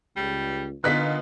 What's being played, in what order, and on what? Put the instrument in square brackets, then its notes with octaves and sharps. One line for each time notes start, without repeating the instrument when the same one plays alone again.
[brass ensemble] C#2 [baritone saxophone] G3
[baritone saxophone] A#2 [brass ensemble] D3 [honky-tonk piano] B3 D#4 F4 [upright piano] F#6 B6